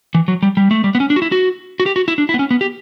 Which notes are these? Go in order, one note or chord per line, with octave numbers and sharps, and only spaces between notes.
E3
F#3
G3
G3
A3
G3
B3
C#4
D4
F#4
E4
F#4
F#4
G4
F#4
E4
D4
E4
B3
C#4
B3
G4